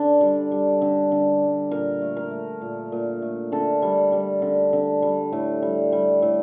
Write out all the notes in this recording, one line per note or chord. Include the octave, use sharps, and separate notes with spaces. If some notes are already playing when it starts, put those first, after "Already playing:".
Already playing: D3 D4
G3
G3
D3
D3
G3
A#2 A#4
A3
A#4
A3
A#2
A#2
A3
D3 A4
G3
G3
D3
D3
G3
A2
G3
G3
A2